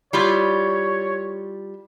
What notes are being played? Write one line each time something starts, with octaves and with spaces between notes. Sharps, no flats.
G3 E4 F4 C#5